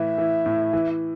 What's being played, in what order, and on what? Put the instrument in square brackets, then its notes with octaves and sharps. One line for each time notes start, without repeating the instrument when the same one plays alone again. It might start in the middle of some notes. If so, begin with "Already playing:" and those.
Already playing: [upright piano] A2 E3 [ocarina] E5
[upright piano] E3
A2
E3